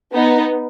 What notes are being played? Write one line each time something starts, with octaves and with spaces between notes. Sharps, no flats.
B3 D#4